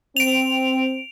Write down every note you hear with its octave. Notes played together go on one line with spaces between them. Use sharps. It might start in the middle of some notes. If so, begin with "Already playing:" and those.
C4 D7 F7